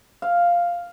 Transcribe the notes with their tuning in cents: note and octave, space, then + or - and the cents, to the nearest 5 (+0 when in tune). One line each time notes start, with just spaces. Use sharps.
F5 +0